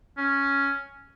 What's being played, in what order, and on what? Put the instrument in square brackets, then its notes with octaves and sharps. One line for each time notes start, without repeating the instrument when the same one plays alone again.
[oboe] C#4